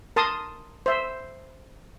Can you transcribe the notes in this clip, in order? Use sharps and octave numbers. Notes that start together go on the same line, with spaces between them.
A#4 A5 C6 D#6
C5 E5